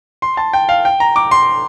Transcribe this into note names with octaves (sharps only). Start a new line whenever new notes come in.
C6
A5
G5
F5
G5
A#5
D6
C6